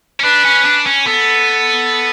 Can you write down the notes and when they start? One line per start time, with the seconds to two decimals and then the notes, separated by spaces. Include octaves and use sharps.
0.20 C#4
0.24 D4 B4
0.45 C#4
0.66 D4
0.87 C#4
1.07 B3 A4